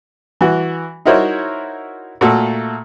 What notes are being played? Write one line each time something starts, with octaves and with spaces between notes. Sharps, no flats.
E3 F#4
D#4 E4 F#4 A#4 C5 C#5
A#2 A3 F#4 A4